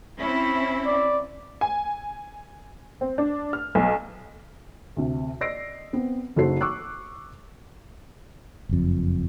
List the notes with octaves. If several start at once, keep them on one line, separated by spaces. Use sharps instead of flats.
C4 C#4 E4
D5
G#5
C4
D4
F6
B1
D2 C3
D5 D#5 E6 A#6 C7 D7
B3 C4
F#1 D#4 F#4 A4 C5 C7
C#6 D6 E6 F#6
F#1 F2